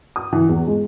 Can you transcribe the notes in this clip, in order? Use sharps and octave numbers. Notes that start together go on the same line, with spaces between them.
D#6
E3
E2
G#3